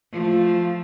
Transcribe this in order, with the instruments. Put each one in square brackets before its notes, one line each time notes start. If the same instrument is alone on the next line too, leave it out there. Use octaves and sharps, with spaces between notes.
[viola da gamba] F3 A3 F4